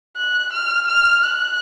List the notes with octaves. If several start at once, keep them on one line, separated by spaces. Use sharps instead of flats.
F#6
F6
F6
F#6